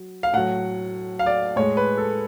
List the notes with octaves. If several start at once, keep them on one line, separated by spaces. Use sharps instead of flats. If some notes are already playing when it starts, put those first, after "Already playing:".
Already playing: F#3
F5
A2 F#3 F#5
F5
D5
A2 G#3 C#5
B4
A4